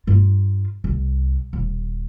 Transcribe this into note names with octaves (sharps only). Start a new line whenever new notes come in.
G2 F4
C2
D#1